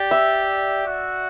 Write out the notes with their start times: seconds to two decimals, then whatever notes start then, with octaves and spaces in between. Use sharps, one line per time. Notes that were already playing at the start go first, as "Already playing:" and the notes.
Already playing: G4 D5
0.11 E5
0.87 F#4